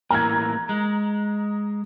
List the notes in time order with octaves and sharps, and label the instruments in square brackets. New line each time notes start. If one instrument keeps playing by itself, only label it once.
[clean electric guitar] A2 E3 A#3 [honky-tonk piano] A#5 G#6
[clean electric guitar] G#3